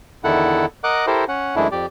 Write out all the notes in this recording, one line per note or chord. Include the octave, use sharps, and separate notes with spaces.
E2 D3 D#3 E4 A4 F#5
A#4 D#5 F#5 D6 F#6
E4 G4 A4 A#4 C5
C#4 F#5
F#2 E3 G#3 A3 D4 E4
F2 G4 D5